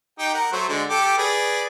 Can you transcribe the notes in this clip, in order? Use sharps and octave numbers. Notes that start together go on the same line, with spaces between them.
D#4 G4 G5
A#4 F#5
F#3 A3 C5
D3 G#3
G4 A4 D6
G#4 B4 D5